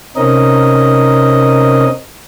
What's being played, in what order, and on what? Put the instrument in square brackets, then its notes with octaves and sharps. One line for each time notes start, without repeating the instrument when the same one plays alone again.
[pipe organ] C3 C4 C#4 D#4 A#4 D#5